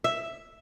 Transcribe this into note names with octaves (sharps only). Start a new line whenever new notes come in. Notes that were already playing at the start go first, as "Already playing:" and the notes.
E5